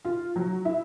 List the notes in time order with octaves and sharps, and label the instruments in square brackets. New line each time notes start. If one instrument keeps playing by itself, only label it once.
[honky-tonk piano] F4
F#3
E4